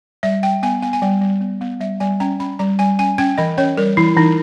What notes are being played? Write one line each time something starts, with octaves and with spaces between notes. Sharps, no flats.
G3 E5
G3 G5
B3 G#5
B3 G#5
G#5
G3 G5
G3
B3
B3
G3 E5
G3 G#5
C#4 A#5
C#4 B5
G3 A#5
G3 G#5
C#4 G#5
C#4 G5
E3 D#5
C#4 C#5
G3 A#4
E3 E4
E3 D#4